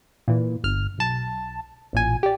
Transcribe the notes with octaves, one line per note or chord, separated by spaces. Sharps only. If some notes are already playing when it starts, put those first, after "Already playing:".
A#2 E3
G1 F6
B1 A5
A1 A#2 G#5
G4 D5